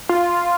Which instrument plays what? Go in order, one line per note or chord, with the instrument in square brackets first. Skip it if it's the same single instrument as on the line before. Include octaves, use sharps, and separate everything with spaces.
[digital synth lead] F4